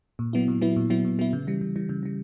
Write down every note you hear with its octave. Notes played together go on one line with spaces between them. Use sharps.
A#2
F#3 B3 E4
A#2
F#3 B3 E4
A#2
F#3 B3 E4
A#2
F#3 B3 E4
C#3
E3 G3
C#3
E3 G3
C#3
E3 G3